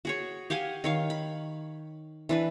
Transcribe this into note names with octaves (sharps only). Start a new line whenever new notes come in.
F#4 G#4 C#5
G4 F5 F#5 G#5
D#3 C#5 F5
B5
E3 D4 B4